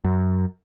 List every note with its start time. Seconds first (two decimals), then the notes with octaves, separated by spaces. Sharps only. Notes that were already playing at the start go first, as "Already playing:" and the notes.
0.04 F#2